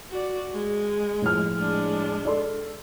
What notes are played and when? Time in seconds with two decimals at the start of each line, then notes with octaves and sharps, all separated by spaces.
0.11 F#4 D5
0.54 G#3
1.22 A2 F3 F6
1.56 G#3 D4
2.25 A4 D5 C6